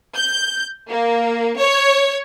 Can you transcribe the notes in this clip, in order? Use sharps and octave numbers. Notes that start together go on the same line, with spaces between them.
G6
A#3
C#5